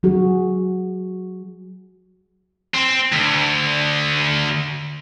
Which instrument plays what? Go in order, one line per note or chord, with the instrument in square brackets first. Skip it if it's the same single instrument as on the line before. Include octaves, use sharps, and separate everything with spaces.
[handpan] F#3 F#4 G#4
[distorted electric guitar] C4
D2